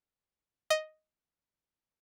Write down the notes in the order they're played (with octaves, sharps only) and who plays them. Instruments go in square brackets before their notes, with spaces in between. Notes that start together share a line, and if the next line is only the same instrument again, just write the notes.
[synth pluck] D#5